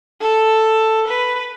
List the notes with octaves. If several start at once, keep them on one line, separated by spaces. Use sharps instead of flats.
A4
B4